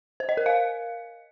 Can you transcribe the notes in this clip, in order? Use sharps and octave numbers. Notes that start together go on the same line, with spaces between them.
C5
D#5
A#4
F5